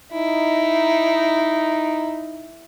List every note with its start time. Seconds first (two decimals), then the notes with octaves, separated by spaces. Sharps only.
0.12 D#4 E4